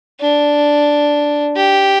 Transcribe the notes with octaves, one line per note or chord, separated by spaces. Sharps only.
D4
G4